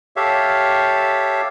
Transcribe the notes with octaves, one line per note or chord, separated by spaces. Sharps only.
G4 A4 C#5 E5 F5